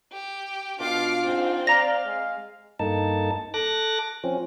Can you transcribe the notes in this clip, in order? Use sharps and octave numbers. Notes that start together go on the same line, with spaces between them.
G4
B2 D4 F4 F5 D6
G#2 C4
D5 F5 A#5 A#6
G#3
G2 A#3 D#4 A4 A5
A4 D6 F#6 A#6
F3 C4 C#4